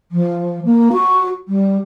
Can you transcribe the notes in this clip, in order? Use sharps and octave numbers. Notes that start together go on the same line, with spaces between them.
F3
A#3
F#4
G3